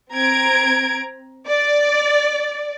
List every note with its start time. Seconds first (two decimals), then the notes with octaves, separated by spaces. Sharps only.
0.12 C4 A#5 G#6 D7
1.47 D5